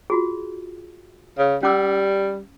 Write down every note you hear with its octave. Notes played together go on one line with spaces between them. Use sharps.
F4 F#4 G#4
C#3
G3 C#4 D6 E6